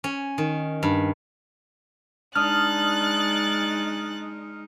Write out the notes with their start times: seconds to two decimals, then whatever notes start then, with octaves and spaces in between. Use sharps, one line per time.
0.04 C#4
0.38 D#3
0.83 G2
2.35 G#3 D4 D#4 D#6 F6 F#6 A6